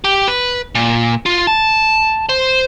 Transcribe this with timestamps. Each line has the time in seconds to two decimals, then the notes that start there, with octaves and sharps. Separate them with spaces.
0.04 G4
0.28 B4
0.75 A#2
1.26 F4
1.47 A5
2.29 C5